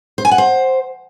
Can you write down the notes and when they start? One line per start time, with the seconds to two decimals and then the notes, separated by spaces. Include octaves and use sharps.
0.18 C5
0.25 G#5
0.31 F#5
0.38 C5